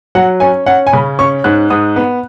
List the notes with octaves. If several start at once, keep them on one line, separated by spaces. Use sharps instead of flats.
F#3 F#5
C#4 G#5
C#4 F#5
G#5
C#3 B5
C#4 C#6
G#2 F#6
G#2 D#6
B3